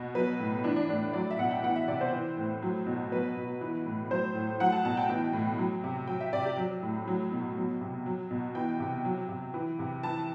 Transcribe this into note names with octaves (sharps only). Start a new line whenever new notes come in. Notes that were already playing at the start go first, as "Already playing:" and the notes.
Already playing: B2
F#3 B4
A2
E3 D4
D4
A2 D4
F#3 D5
E5
B2 F#5
G5
E3 F#5
E5
C3 D5
C5
E3
A2
F#3
B2
F#3 B4
B2
E3
A2
F#3 C5
A2
F#3 F#5
A5
B2 A5
G5
E3
A2
F#3
C3
F#3 G5
E5
C3 D5
G4
F#3
A2
F#3
B2
F#3
C3
F#3
B2
E3 G5
C3
F#3
C3
E3
C3
E3 A5